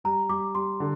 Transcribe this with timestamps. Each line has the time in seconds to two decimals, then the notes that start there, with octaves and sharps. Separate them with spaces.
0.04 G3 A#5
0.29 G3 D6
0.55 G3 C6
0.80 D3